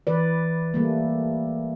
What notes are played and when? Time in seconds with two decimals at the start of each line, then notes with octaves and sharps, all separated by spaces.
0.07 E3 B4 D5
0.74 G3 A3 A#3